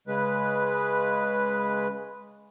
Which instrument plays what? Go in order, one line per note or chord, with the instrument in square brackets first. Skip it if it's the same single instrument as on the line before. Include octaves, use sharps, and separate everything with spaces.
[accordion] C#3 G#3 B4